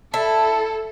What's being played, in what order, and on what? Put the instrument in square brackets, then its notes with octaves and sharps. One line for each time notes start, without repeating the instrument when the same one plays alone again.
[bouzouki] E4 [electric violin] A4 [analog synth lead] A5